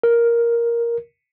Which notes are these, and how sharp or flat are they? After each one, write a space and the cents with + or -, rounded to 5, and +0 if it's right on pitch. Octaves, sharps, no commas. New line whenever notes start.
A#4 +5